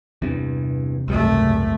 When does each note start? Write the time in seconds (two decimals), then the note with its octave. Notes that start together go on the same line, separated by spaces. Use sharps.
0.22 E2 G2 C3
1.08 G#1 C#2 F#2 G3 A3